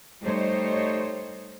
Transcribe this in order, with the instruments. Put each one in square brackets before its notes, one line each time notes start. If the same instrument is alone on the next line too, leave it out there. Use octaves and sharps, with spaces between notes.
[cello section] G3 A3 D#4 C5 C#5